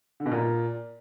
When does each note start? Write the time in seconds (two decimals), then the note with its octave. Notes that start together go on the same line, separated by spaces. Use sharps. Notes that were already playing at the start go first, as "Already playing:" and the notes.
0.20 D3
0.26 B2
0.32 A#2